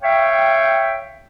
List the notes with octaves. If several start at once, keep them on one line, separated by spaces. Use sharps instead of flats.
C#5 E5 F5 G5